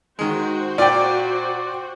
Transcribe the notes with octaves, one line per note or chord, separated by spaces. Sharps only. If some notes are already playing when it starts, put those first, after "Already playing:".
D#3 G#3 F#4 C5
A#2 D5 G5